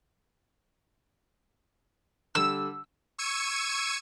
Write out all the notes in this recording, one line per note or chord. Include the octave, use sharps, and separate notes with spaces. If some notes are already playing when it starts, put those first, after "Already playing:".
D3 G3 E6
C#6 E6 G#6 C#7 D#7